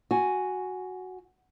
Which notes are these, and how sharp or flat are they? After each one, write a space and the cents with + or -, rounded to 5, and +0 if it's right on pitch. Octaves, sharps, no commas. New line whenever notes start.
F#4 +0 G#5 +0